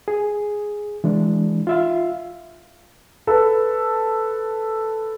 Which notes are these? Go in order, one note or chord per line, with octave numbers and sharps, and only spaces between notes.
G#4
E3 G#3 D4
F4 E5 F5
A4 B4